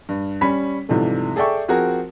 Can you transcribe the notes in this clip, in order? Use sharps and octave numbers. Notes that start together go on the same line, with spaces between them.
G2
G3 C#4 B5 B6
G#2 C3 E3 F3 G3 A3
G#4 A4 D5 E5 G5 C#6
F3 C4 F#4 G#4 A#4